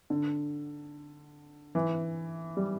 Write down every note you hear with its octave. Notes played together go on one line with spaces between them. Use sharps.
D3
E3
G3